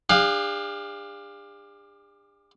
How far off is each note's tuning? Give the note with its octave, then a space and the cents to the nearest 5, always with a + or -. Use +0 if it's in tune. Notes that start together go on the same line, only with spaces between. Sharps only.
D4 +20 G#4 -45 F5 +10